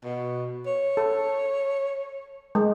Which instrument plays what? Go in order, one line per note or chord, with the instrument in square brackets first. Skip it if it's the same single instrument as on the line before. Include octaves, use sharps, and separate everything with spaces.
[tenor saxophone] B2
C#5
[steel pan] A4
G#3